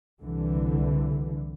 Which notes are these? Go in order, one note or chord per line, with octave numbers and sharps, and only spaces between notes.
C2 D3 E3